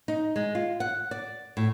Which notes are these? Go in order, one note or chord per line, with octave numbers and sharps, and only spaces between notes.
D#4
G#3
F4
F#5
D5
A2